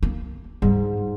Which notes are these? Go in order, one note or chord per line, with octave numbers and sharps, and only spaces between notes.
A#3
G#2 G3 F4